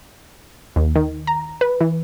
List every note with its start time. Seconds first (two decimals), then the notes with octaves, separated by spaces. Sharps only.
0.76 D#2
0.96 D#3
1.27 A#5
1.61 B4
1.81 E3